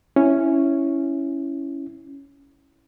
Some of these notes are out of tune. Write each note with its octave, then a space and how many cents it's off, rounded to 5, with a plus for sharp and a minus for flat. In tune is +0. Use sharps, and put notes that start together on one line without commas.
C#4 +0 E4 +0